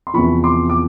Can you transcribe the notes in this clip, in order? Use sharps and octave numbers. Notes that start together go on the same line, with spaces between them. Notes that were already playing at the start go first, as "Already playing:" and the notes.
C6
E2 C3 F3 B5 C#6
C6 D6
D6